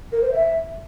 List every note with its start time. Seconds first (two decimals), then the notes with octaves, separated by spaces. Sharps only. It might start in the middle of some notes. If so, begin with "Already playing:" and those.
0.12 A#4
0.22 C5
0.32 E5